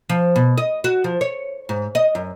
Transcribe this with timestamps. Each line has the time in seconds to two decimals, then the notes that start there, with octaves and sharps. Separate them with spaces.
0.09 F3
0.36 B2
0.58 D#5
0.84 F#4
1.04 F3
1.21 C#5
1.69 G#2
1.95 D#5
2.15 F#2